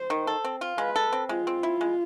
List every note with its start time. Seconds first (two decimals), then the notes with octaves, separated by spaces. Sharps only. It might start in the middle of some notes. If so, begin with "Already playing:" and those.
Already playing: C5
0.10 D#3
0.27 A4
0.45 C4
0.61 F4
0.78 G#3 B4
0.96 A4
1.13 C4
1.29 G#3 F4
1.47 C4
1.63 E4
1.81 G#3